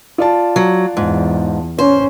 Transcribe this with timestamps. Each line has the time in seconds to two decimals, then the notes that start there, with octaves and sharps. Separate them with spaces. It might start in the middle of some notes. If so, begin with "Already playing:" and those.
0.18 F4 D5 A5
0.56 F#3
0.97 E2 G#2
1.79 C#4 C5